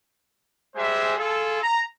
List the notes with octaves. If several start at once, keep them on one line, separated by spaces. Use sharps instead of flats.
G3 G#3 G#4 C5 E5
F4 G#4 A4
A#5